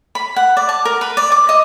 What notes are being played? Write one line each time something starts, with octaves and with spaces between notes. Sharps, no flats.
B5
F#5
D5
A5
A#4
B4
D5
D6
D#5